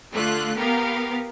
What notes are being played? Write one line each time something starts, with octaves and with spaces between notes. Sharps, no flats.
D3 A3 F4 F#6
B3 G4 A#4 F5